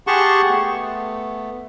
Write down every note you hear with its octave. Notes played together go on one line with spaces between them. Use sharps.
G4 G#4 F#5 A5 C6 C#6
A3 B3